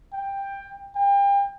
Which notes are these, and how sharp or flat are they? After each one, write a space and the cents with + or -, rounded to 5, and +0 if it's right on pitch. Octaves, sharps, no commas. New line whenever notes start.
G5 +15
G5 +35